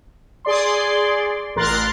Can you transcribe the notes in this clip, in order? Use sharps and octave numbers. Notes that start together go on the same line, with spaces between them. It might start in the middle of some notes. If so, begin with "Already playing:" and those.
G#4 D5 C6
A1 A#4 C6 F#6 A6